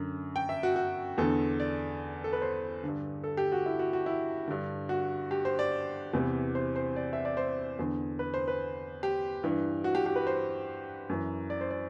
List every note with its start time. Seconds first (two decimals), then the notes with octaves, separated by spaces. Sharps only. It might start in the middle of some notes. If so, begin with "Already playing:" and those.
Already playing: F#2 D3
0.36 G5
0.49 E5
0.63 F#4
0.76 F#4
1.18 E2 D3 A4
1.60 D5
2.24 A4
2.33 B4
2.42 C5
2.84 G2 D3
3.24 A4
3.37 G4
3.52 F#4
3.66 E4
3.79 F#4
3.93 F#4
4.06 E4
4.47 G2 D3
4.89 F#4
5.31 G4
5.45 C5
5.59 D5
6.13 E2 C3 E3
6.55 C5
6.76 C5
6.96 D5
7.13 E5
7.25 D5
7.37 C5
7.79 E2 D3
8.19 B4
8.34 C5
8.48 B4
9.03 G4
9.43 G2 E3
9.84 F#4
9.95 G4
10.06 G4
10.16 B4
10.27 C5
11.09 F#2 E3
11.50 D5
11.61 C5
11.70 D5